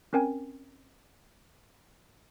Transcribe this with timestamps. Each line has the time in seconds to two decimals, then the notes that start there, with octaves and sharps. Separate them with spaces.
0.13 C4 C#4 A#4 G5 G#5